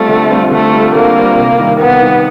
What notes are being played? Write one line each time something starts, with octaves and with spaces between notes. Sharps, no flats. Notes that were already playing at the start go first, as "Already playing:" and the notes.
Already playing: G3 A3 C4 F4
D3
G3 C4 F4
D3 A3
G3 C4 F4
D3 A#3
G3 C4 F4
C3
D#3 G3
C3 B3
D#3 G3